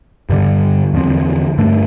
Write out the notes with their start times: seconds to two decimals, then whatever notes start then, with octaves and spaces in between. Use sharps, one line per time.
0.29 G2 D3 G3
0.94 E2 D3 F3 C4
1.58 G2 D3 A3 D4